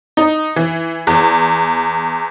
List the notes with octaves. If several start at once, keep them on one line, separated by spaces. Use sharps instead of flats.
D#4
E3
E2